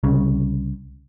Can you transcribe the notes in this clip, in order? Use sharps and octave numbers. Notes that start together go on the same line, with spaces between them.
C2 C#3